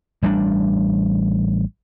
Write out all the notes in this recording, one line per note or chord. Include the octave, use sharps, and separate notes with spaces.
A1 G3 G#3 D4